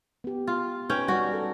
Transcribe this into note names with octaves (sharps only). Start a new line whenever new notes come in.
B3 G4
F4
C#4 D#4 B4 G5
G3 D#4 F#4 D5
A4